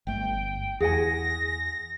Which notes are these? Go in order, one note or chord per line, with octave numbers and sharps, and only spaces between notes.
G1 A3 G5
E2 G#4 F#5 G#5 A#6